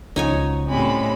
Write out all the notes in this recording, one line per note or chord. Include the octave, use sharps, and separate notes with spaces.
C#2 F3 D#4 F#4 C#5 G#5
A2 G3 G#3 C4 C#4 B5